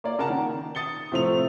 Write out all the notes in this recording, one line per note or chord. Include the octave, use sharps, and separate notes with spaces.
A#3 C#5 D5
C#3 A#4 F#5 A5
D#3
D#6 A6 C#7 G7
A2 C3 F3 A3 F7